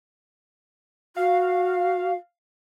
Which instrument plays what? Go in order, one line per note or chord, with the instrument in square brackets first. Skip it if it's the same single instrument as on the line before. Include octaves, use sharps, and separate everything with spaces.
[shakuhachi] F#4 [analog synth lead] F5